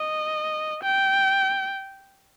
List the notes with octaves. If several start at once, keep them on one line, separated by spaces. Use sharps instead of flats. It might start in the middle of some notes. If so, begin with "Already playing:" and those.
Already playing: D#5
G5